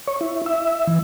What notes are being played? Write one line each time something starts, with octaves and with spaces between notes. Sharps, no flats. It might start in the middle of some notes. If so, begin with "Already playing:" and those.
C#5
E4
E5
E3